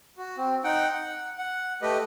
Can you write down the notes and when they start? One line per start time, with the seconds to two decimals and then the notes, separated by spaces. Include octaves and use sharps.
0.18 F#4
0.37 C4
0.64 D#4 F#5 G5
0.93 F#5
1.38 F#5
1.82 A3 G4 B4 D#5